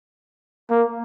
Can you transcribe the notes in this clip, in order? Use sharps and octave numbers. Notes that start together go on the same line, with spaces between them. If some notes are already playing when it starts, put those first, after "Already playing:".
A#3